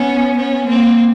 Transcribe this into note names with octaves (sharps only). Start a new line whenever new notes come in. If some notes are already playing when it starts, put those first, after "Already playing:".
Already playing: B3 C#4
B3 C#4
A#3 C4